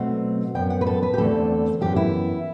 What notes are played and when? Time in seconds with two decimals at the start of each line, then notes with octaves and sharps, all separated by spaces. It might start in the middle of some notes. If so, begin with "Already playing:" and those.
Already playing: B2 F#3 A3 C4 F#5
0.55 F#2 F#3 B3 G5
0.70 F#5
0.81 B4
0.87 A4
1.03 B4
1.14 G4
1.18 E2 D3 A3 C4 A4
1.81 F#2 E3 B3 G4
1.96 E4